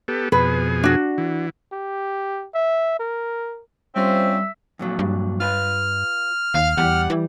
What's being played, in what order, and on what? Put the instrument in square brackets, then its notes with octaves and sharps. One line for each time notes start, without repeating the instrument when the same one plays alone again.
[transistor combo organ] B3 G4 A4
[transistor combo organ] F2 B2 G#4 [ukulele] B4
[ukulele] D4 F#4
[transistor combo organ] E3
[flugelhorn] G4
E5
A#4
[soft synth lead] G3 [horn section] C4 C#4 F4 [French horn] C5 [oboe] E5
[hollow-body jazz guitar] F2 A#2 F#3
[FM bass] G2
[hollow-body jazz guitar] F4 B4 [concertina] F6
[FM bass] D#2 [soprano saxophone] F5
[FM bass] E2 [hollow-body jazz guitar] G3 G4 [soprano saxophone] F#5
[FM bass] E3